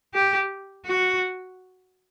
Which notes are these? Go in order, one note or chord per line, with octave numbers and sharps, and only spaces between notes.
G4
F#4